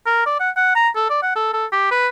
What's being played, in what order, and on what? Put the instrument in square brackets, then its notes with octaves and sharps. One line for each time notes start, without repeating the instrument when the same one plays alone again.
[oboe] A#4
D5
F#5
F#5
A#5
A4
D5
F#5
A4
A4
G4
B4